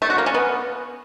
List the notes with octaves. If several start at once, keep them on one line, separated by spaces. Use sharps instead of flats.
A3
F#4
A#3
C#4
B3